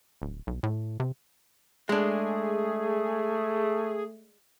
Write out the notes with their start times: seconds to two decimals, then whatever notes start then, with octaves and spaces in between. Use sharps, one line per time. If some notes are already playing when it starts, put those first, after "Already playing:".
0.22 D1
0.47 B1
0.63 A2
1.00 C3
1.89 G#3 A3 D4 G#4